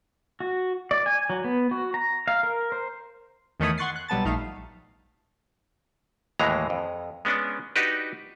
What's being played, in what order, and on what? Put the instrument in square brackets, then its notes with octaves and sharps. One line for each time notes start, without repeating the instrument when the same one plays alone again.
[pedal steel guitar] F#4
D5
G#5
F#3
B3
F#4
A#5
F5
A#4
C5
[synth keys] E2 D#3 A3 C#5 B5 D#6
F#5 C6 C#6 F#6 A6 C7
F#6
B1 G3 B3 A5 A6
A#1 A3 D#4 F5 E7
[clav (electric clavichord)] D#2 A2 E3 G#3 A#5
F2
G#3 B3 C#4 D4
D4 D#4 F#4 G4 B4